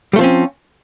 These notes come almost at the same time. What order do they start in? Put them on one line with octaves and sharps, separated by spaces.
G3 A3 F3 C4 C#4